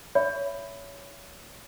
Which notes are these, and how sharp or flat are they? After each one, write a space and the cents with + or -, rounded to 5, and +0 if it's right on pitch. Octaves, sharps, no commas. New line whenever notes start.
C#5 +25 E5 +15 B5 +15